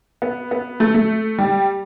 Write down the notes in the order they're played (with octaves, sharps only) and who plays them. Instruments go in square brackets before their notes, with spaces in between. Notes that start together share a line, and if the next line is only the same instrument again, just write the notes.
[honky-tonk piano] B3
B3
A3
A3
G3